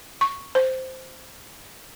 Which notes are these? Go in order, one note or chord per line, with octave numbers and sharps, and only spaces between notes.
C#6
C5